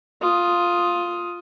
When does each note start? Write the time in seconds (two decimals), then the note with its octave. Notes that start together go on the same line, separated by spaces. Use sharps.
0.21 F4 D#6